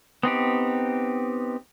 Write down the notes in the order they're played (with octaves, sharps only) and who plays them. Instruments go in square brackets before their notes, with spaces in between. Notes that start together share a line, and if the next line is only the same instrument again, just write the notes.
[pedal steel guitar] B3 C4 D#4 G4